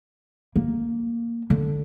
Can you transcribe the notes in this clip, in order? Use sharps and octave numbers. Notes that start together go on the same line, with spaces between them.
A#3
D3